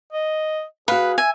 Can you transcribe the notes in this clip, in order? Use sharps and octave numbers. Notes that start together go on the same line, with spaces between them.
D#5
F#4 G#4 B4 F5
E5 G#5